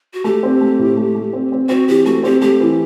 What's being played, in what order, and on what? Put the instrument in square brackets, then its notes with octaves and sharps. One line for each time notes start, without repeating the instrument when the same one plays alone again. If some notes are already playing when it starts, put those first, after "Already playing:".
[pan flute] F#4
[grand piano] A3 [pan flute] G4
[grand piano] C4
A3
A2
A3
A3
C4
C4
[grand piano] C4 [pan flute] F#4
[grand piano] E3 [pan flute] G4
[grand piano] A3 [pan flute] F#4
[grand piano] C4 [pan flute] G4
[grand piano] A3 [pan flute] G4
[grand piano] E3